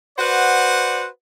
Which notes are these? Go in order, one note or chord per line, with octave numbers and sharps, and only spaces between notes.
F#4 B4 C5 D5 F#5